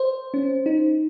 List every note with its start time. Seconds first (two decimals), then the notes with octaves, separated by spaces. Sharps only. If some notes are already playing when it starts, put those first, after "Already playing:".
Already playing: C5
0.34 C#4
0.66 D#4